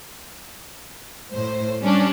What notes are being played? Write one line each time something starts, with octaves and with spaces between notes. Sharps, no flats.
A2 C5
G3 C#4 D4